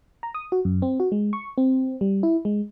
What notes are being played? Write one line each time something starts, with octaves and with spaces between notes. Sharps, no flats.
A#5
D#6
F#4
F#2
C4
F#4
G#3
C#6
C4
G3
E4
G#3